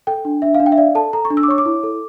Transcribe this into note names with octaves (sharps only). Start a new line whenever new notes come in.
A4 G5
D4
D4 E5
F5
D4
G5
E5
D5 F5
A4 A5
A4 A#5
C#6
D4
E6
D6
C#5 C#6
D6
E4
A4